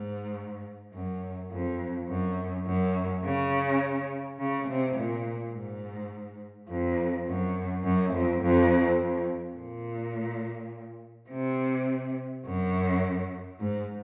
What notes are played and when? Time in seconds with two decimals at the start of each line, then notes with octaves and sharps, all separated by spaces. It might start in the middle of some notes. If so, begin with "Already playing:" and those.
Already playing: G#2
0.93 F#2
1.51 F2
2.09 F#2
2.66 F#2
3.24 C#3
4.39 C#3
4.68 C3
4.96 A#2
5.54 G#2
6.69 F2
7.27 F#2
7.84 F#2
8.13 F2
8.42 F2
8.99 F2
9.57 A#2
11.30 C3
12.45 F#2
13.59 G#2